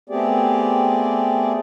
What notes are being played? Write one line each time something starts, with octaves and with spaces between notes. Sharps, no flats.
A3 B3 C4 G4 G#4 D5